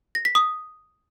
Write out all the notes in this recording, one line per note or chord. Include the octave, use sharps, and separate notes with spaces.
A#6
B6
D#6